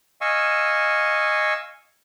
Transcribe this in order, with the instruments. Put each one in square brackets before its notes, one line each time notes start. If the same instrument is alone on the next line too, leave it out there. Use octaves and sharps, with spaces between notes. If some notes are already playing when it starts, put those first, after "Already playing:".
[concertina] D#5 F5 G#5 C#6 E6